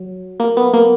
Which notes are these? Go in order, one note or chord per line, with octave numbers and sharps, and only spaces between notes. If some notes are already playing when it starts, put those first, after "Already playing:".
Already playing: F#3
A#3
B3
A#3